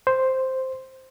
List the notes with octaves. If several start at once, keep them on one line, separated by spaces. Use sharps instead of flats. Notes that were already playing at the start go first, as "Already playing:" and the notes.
C5